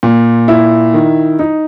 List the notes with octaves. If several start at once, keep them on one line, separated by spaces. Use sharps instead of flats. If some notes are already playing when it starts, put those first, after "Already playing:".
A#2
E4
D#3
D#4